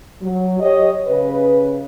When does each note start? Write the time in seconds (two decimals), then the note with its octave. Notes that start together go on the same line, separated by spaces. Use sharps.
0.22 F#3
0.60 G4 C#5 D#5
1.07 C#3 B4